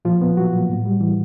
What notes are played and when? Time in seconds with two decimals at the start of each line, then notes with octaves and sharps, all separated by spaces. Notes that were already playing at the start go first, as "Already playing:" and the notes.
0.05 A#2 F3 F4
0.22 B3
0.37 F#3 F#4
0.53 A#2
0.69 A2
0.85 G3
1.01 E3